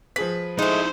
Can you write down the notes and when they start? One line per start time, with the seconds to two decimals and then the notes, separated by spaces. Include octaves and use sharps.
0.16 F3 G#4 B4 B6
0.59 G#3 A3 D#4 E4 C5